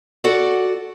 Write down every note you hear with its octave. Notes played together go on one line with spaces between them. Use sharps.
F#4 A4 D5 F#5